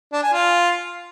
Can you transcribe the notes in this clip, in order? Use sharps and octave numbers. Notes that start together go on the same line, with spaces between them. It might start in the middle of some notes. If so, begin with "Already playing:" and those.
D4
G#5
F4